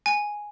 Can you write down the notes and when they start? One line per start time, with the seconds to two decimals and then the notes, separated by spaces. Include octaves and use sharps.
0.06 G#5